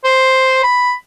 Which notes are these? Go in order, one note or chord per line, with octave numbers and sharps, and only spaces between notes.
C5
B5